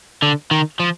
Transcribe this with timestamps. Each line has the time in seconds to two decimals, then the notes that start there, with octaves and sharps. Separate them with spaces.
0.22 D3
0.51 D#3
0.80 F3